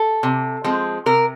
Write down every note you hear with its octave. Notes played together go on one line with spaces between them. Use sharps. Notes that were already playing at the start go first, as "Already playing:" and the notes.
Already playing: A4
C3
F3 G#3 C4
C3 A#4